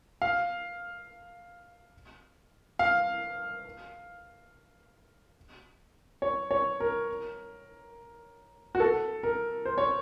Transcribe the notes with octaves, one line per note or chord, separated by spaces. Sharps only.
F5
F5
C#5
C#5
A#4
F#4
A4
A#4
C5
C#5